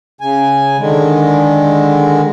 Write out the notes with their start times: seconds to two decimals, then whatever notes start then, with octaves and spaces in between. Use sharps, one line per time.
0.21 C#3 G#5
0.79 D3 D#3 G#3